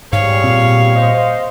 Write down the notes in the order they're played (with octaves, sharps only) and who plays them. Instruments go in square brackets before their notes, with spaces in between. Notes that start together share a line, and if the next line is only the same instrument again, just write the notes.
[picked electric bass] G#2 [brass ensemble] B2 G3 G#4 [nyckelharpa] C#5 [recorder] F5
[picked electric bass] A#2 C4
[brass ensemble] C5 D#5